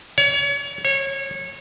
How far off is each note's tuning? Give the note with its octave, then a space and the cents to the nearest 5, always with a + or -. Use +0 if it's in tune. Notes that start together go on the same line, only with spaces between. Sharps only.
C#5 +30
C#5 -25